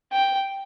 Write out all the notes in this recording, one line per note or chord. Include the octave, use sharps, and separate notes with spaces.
G5